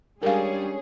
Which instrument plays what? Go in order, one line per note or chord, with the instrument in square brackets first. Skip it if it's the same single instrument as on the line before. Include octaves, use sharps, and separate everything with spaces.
[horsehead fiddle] G3 D4 [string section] G#3 C#4 G#4 [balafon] A#4 F5